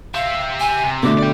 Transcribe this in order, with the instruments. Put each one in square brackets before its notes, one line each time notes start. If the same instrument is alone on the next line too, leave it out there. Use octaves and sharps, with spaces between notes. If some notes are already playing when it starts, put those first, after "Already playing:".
[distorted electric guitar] G4 E5 [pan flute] F5
[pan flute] G#5
[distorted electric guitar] C3
[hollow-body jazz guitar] B2 D3 A3 [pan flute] D6
[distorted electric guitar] D5 G5